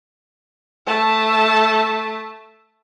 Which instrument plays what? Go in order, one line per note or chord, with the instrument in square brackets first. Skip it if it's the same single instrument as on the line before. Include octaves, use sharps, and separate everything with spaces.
[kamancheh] A3 A5